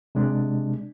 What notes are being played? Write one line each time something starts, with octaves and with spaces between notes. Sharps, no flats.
C3 G#3 D4